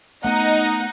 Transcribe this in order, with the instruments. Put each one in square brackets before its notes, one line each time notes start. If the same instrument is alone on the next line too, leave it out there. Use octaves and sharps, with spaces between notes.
[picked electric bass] A3 B3 [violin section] D#4 D#5 A#5 [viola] F#5